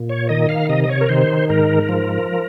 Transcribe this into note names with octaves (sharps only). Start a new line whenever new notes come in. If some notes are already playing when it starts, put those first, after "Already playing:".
Already playing: A#2
C#5
D#3 D#5
F5
C3 D#5
D#5
C#5
A#4
D#3 C5
G#2 A#4
F3